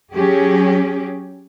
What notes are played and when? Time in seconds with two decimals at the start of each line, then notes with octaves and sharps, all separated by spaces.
0.12 F#3 C#4 G4 G#4